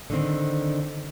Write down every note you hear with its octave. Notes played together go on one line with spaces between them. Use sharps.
D3 D#3 C4